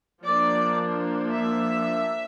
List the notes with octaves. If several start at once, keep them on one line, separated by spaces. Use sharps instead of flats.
F3 A#3 D4 D5
E5